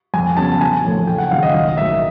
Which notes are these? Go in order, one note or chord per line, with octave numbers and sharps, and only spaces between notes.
F2 G#5
C#3 F#3 B3 A5
A#1 G#5
A2 F3 A3
F#1 G5
F#5
F#2 D#3 G#3 F5
D#5
B1 D#5
A2 F#3 A#3 E5